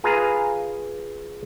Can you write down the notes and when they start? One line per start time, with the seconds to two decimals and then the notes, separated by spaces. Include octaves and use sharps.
0.04 F4 G#4 B4 F5 G#5 A#5